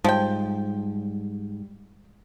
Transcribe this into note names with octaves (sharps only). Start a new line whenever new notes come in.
G#2 F3 G3 G5